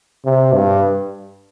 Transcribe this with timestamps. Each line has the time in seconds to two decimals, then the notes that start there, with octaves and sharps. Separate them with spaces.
0.25 C3
0.53 G2